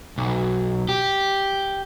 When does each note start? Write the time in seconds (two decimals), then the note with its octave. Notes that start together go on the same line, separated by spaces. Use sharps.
0.18 B1
0.89 G4